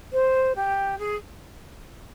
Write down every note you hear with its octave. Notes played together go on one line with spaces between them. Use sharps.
C5
G4
G#4